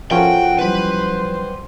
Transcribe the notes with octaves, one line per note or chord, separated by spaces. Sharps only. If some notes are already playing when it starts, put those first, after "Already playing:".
F3 C#4 F#4 A4 A#4 G5
E3 F#3 G3 B4 C5